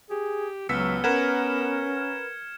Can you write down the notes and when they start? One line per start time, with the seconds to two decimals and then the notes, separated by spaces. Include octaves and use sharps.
0.10 G4 G#4
0.69 C#2 F#3 B3 E6 F6 B6 C#7
1.04 C#4 A#4 B4 F#5 G#6 E7